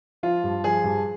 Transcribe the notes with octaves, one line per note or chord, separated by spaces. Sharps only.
F3 F4
G2
F3 G#4
G2